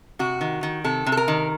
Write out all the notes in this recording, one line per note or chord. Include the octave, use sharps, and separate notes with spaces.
C3 F#4
D#3
D#3
C3 A4
C3
A4
A#4
D#3